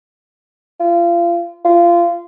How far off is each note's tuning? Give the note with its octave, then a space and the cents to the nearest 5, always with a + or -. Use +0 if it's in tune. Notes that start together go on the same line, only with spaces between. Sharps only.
F4 -30
F4 -20